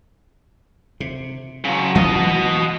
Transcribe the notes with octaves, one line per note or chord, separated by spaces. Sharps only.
C3
C#3 F#3
E3 F#3 G#3 F#4 D#5